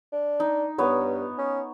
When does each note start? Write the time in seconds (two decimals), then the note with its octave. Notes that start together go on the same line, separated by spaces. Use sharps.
0.12 D4
0.40 D#4
0.78 G2 B3 C#5
1.38 C#4